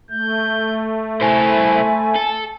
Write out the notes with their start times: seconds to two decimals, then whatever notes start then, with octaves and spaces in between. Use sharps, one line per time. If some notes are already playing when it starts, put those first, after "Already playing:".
0.11 A3 G6
1.21 E4 C5 G#5 B5
2.15 A4